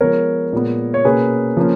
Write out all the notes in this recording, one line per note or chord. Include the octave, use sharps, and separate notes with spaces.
F3 G#3 B3 A#4 C#5
A#2 G#3 B3
C#5
B2 A#3 C#4 G#4 B4
F3 A#3 C#4